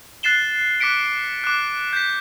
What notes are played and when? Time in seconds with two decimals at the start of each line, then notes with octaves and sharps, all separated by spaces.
0.23 F#6 A6 C7 E7 G7
0.80 D6 F#6 B6 C#7 D7
1.44 D6 F#6
1.93 G6 B6